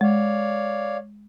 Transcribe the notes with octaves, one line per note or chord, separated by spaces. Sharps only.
G#3 C#5 D5 F5